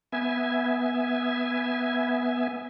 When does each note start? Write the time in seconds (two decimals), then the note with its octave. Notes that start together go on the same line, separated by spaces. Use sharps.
0.12 B3 E5 G#5